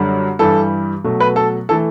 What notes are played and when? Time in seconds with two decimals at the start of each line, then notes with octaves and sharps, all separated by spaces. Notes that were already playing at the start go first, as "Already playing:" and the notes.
Already playing: F#2 D3 G3
0.39 G2 E3 G3 A4
1.04 B2 F#3 A3
1.20 B4
1.36 A4
1.69 E3 A3 A4